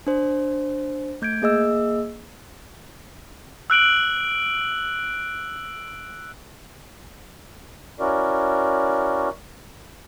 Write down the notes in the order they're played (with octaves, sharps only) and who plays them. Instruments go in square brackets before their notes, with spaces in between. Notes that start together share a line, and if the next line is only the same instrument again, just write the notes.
[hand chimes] D4 C5
A3 G6 G#6 D7
A#3 G#4 D#5 E6
[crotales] E6 F#6 D7 F#7
[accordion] C#4 E4 F#4 A#4 D5